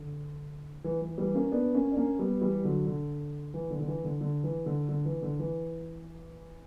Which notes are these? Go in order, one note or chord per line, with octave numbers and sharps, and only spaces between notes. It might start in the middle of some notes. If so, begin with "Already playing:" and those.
Already playing: D3
E3
E3
E3 G3
A#3 C#4
B3 D4
A#3 C#4
D4
A#3 C#4
G3 B3
E3 G3
D3 F#3
D3
E3
D3
D3
E3
D3
D3
E3
D3
D3
E3
D3
E3